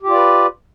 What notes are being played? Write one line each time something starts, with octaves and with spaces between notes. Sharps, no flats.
F4 G4 B4 D5